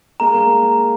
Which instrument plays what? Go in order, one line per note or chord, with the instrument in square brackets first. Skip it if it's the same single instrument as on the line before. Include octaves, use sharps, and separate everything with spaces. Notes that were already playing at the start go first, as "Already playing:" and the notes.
[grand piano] G#3 A#3 [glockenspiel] A#5
[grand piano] G#3 A#3